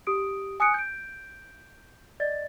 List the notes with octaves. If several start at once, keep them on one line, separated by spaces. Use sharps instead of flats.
G4 D#6 D7
G#5 D#6 F#6 C#7 D7
G6 D7
D5 D#5 A6